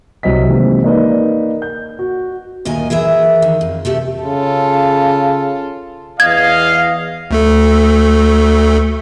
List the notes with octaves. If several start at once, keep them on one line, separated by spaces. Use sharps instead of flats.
C2 F#3 C4 D#5 B6
C3 D#3 E3 G#3 A#3
A#3 D#4 A#4 B4 D5 D#5
G6
F#4
D2 A#2 D#3 A#4 D#5 G#5
E3 G#4 A#4 E5
D#3
F2
C3 A3 G4 E5
C#3 F4 A4
E2 D#5 F5 G#6
D2 A3 A4